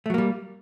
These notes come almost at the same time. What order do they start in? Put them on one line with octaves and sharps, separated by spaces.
A3 F#3 A#3 G3